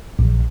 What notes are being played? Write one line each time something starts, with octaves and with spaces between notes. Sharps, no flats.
A#1